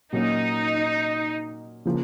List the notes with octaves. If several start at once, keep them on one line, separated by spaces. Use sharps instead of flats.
A#2 F#3 A#3 C#4 D#4
C#3 F3 A#3